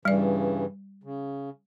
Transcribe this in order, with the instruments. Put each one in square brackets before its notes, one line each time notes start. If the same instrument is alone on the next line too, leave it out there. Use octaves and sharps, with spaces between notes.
[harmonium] G2 C#3 E3 [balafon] G3 D5
[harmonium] C#3